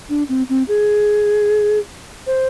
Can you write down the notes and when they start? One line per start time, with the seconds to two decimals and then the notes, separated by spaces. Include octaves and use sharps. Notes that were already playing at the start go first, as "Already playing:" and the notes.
0.09 D4
0.29 C4
0.49 C4
0.68 G#4
2.27 C5